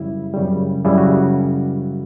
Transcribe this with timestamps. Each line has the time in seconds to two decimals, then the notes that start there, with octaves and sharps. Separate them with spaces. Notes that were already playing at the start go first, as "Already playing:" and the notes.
Already playing: F#2 C#3 G3 E4
0.34 F#2 C#3 G3
0.85 F#2 C#3 G3 E4
0.98 F#4